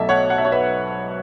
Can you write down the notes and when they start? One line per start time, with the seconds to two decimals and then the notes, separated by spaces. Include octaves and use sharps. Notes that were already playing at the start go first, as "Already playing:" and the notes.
Already playing: B1 B2 A3 E5 A5
0.09 C#5 F#5
0.30 F#5
0.38 E5
0.45 C#5
0.52 B4 E5